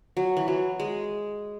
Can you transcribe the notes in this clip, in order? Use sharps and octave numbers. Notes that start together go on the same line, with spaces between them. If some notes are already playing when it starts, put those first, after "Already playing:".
F#3
E3
F#3
G#3